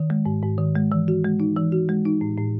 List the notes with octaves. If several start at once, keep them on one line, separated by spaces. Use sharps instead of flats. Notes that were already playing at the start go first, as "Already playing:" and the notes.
Already playing: D#3
G#3
G#2
G#2
D#3
G#3
E3
F#4
G#3
D#4
E3
F#4
G#3
D#4
A2
A2